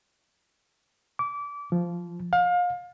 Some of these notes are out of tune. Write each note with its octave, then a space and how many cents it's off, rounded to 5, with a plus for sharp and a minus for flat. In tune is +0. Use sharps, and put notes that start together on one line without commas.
D6 -25
F3 -10
F5 +30